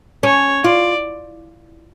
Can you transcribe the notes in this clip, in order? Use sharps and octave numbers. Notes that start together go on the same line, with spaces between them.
C#4 C#5
F4 D5